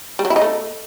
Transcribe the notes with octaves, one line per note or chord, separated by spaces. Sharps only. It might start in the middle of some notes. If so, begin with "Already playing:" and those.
G3
F#3
E4
D#4
A3